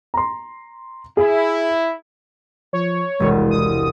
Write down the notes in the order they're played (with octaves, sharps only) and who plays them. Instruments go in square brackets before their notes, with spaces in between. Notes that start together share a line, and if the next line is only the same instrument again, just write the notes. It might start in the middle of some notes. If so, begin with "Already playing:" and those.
[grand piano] A#5 C6
[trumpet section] E4 [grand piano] G#4
[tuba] F3 [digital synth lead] C#5
[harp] E1 C2 [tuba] G#3
[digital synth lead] D#6